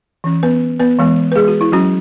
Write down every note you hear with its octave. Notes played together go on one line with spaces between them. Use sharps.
E3 C#4
B3 B4
B3 B4
E3 G#3 B3
B4
G#3 G#4
F#4
E4
F#3 C#4 F#4